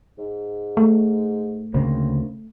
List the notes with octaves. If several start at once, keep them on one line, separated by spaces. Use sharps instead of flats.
G#2
A3
D2 C#3 A#3 C4